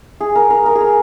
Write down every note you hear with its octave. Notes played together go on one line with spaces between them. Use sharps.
G#4
A#4
A#4
A#4
G#4
A#4